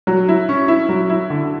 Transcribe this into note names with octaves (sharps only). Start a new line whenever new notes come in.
F#3
E4
C#4
E4
F#3
E4
D3